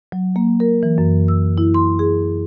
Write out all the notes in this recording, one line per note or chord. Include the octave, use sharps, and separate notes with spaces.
F#3
A#3
A#4
E3
F#2
E6
E4
C6
G#4